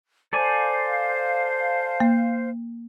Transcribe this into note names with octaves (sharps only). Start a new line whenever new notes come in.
A4 C5 D5 F5 G#5
A#3